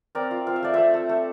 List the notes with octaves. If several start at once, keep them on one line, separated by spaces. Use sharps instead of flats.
C4 A#4 D5
F4
C4 F5
E5
A3 D5
A3 C5 E5
A3
A3